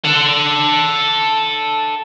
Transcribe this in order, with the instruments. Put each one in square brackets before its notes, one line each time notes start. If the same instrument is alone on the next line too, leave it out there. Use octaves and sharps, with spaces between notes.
[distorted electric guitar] A4 F#5